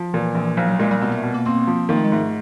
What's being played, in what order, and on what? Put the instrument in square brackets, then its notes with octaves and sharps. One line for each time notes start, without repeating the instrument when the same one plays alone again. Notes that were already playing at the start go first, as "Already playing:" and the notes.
Already playing: [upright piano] F3
[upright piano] A#2 [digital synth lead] E3
[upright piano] A#1
[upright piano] B1 [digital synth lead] F3
[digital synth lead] F#3
[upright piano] A#2 [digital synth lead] G#3
[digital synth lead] G3
[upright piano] B2 [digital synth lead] G#3
[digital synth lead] A3
[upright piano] B2
[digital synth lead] A#3
[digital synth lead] A#3 [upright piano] C4
[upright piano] F3
[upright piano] D#3 [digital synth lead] A#3
[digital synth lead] A3
G#3
[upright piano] G#2 [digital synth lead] A3